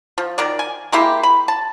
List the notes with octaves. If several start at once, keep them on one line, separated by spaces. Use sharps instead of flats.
F3
D#3 A#4 D5
G#5
G#3 A#3 E4 G4
B5
A5